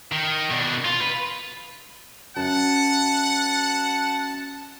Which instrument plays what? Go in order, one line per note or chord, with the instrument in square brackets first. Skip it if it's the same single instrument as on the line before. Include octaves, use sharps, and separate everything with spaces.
[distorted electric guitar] D#3
B2 D4
F4
B4
[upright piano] F#2 [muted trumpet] F#5 [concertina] A5